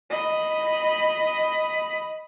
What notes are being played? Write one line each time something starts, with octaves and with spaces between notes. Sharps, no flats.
D#5 B5